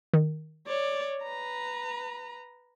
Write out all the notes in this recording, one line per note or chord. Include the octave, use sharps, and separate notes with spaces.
D#3
C#5 D5
B4 A#5